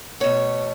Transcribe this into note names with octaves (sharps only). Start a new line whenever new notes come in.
B2 A3 C#5